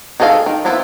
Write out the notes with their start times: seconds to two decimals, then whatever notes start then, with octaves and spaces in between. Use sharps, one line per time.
0.20 D#3 G#4 A4 D#5 F5
0.46 D#3
0.65 B3 C4 E4 F4